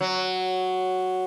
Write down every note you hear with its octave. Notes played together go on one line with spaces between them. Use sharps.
F#3